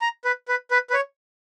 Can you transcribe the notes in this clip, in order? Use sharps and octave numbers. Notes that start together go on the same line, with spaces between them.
A#5
B4
B4
B4
B4
C#5